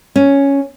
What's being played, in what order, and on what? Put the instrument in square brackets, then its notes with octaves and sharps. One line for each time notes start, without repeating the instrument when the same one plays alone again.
[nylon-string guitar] C#4